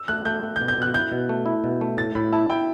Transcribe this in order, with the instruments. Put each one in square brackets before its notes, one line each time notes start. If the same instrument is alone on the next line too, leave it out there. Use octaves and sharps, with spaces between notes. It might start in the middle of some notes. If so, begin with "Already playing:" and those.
Already playing: [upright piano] E6
[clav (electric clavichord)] A3 [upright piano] F#6
[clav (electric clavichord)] A3 [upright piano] G6
[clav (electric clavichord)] A3
[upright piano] G6
[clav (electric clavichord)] B2
[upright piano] G6
[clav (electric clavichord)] B2 [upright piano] F#6
[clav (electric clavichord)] E4 [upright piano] G6
[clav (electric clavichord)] B2
A3
E4
B2
A3
[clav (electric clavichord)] A2 [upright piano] A6
[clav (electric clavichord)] A2 [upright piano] B5
[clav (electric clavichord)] E4 [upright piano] A5
[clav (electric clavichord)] E4 [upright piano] G5